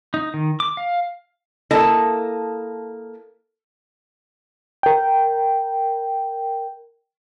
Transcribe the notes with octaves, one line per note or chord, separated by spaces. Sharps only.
D#4
D#3
D6
F5
A#3 E4 A4 D#5 A5
A#4 G5